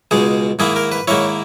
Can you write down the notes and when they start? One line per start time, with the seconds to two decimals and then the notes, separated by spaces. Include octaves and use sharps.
0.11 C#2 B2 G#3 G#4
0.59 G#2 D#3 A#3 E4 G#4
0.76 A#4
0.92 B4
1.08 G#2 D#3 A#3 E4 C#5